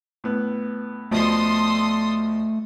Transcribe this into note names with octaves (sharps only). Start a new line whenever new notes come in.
A2 B3
D2 B2 F3 A3 A4 C6 D#6